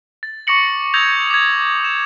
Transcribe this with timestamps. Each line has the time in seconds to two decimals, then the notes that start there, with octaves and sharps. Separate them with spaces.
0.23 A6
0.47 C#6 D6 A#6 C#7 F#7
0.94 D#6 E6 G6 G#6 A#6 F7
1.30 D6 G#6
1.84 E7